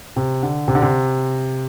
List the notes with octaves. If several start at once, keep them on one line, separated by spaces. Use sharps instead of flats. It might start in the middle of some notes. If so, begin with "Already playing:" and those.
C3
D3
C3
D3
C3